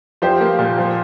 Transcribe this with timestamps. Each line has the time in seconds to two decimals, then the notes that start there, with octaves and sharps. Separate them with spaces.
0.22 F3 G4 C5
0.41 A#3
0.59 A#2
0.78 F3